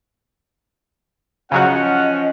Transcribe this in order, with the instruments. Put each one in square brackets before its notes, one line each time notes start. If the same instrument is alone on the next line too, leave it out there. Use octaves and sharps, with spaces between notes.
[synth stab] C#3 F#3 F#4 [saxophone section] F3 C#4 [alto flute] D#5 [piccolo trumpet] F#5